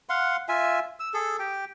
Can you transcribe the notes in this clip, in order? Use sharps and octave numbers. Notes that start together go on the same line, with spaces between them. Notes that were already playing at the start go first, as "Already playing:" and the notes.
F5 F#5 C6
F4 E5 G#5
E6
G#4 A4
G4 G5